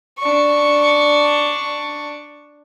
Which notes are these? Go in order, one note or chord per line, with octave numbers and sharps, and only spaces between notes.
D4 C#6